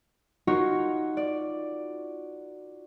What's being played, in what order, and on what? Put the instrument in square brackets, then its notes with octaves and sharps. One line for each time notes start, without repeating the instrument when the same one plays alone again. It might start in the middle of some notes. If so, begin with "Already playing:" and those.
[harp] D#4 F4 F#4 A#4 C#5
D5